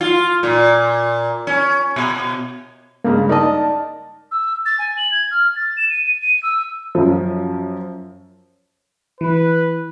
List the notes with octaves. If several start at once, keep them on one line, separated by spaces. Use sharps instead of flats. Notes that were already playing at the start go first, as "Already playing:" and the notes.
F4
A#2
C#4
B2
G2 C#3 G#3 A#3
D#4 A#4 D5 D#5 A5
E6
A6
G#5
F#7
G#6
F6
A6
E7
D#7
D#7
E6
F#2 F3
E3 B4